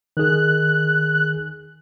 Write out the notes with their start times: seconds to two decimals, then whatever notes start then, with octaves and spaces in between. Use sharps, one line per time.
0.17 D#3 G#4 F#6